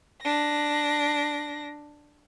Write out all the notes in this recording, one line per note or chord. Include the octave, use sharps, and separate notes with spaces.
D4 A#6